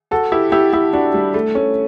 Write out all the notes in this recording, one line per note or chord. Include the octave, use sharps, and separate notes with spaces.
F#4 A4
E4 G4
E4 G4
E4 G4
D4 F#4
G3
A3
A3 C#4